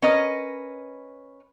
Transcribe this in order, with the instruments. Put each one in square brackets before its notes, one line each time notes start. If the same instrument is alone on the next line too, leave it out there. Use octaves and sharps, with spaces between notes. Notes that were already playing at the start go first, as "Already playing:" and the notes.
[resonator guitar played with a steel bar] C#4 A#4 B4 D#5